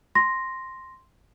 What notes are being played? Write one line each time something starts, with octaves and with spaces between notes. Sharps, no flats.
C6 A#6